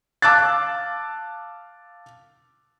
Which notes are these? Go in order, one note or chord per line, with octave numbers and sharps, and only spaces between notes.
F5 A5 D6 E6 F#6 A6